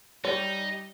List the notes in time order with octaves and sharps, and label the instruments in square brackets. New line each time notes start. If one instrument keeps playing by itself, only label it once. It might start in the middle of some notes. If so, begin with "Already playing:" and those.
[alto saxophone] G3 [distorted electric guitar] D#4 [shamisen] C#5